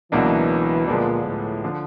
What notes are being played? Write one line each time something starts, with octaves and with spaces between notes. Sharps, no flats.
C#2 B2 E3 F#3 A#3 D4
A#2 D3 F3 G#3 B3 D4
A2
D3 F3